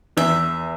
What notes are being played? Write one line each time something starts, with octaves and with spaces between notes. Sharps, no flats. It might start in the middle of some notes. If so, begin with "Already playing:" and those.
E2 E5